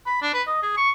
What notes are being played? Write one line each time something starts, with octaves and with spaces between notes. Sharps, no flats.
B5
D4
B4
D#5
G#4
C#6